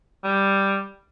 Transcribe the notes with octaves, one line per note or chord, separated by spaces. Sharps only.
G3